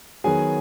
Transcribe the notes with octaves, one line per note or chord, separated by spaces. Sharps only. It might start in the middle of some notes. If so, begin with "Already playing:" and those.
D#3 F#3 B3 G#4 G#5